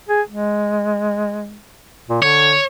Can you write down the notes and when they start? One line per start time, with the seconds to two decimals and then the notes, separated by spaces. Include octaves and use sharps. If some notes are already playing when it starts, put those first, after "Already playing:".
0.09 G#4
0.30 G#3
2.09 A#2
2.22 D3 C#5